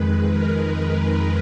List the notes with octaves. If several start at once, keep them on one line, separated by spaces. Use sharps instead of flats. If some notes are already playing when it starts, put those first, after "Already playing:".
Already playing: F2 D#3 G#3 B4
A#4
B4